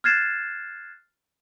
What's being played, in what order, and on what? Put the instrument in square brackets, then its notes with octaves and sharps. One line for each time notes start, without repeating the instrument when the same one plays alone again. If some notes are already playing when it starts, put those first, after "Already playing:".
[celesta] F6 F#6 G#6 A6 C7 E7